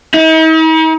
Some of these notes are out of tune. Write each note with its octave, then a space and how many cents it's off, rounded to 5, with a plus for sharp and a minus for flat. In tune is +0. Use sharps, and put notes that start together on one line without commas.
D#4 +45